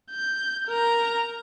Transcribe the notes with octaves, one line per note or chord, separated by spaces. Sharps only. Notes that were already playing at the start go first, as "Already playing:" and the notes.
G6
A#4 A#5